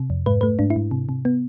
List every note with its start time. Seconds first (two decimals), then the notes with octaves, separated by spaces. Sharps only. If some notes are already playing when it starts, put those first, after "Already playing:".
Already playing: C3
0.10 F2
0.26 G#2 B4
0.41 A3 B4
0.59 G#2 D4
0.70 E4
0.76 G#2
0.91 C3
1.09 C3
1.25 B3